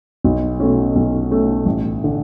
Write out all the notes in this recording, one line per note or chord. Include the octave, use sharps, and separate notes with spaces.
B1
B2 A3 C#4
B1
B2 A3 C#4
A1
D3